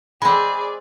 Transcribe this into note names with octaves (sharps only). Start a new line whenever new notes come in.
G#3 C4 G#4 D5 B5